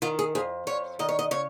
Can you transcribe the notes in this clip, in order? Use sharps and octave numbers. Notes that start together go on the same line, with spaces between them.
D#3 F4
G#4
F2 G#4
F2 C#5
D#3 D#5
C#5
D#5
C#3 C#5